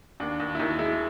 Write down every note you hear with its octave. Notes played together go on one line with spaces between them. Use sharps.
D#2 D4
D#2
E4
D#2 D#4
G#3 E4